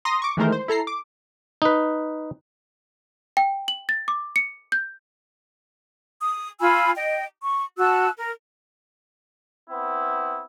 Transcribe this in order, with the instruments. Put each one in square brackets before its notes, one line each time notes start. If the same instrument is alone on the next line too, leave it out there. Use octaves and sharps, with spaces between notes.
[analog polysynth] A#5 C6 D#6 A#6
C#6 D6
D#3 E3 G#3 A3 A#4 C5
C5
E4 A4 A#5 C7
D6
[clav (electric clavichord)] D#4 B4
[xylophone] G5
F#7
A6
D6
C#7
G6
[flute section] D#6
F4 G#5 B5 E6
D#5 G5
C#6
F#4 A5 E6 F#6
A#4
[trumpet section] B3 C4 E4